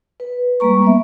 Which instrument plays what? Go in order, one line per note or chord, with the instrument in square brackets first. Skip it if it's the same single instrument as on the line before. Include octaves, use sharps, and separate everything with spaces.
[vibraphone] B4
G3 G#3 A#3 A#5 C#6
A#3 B3 E5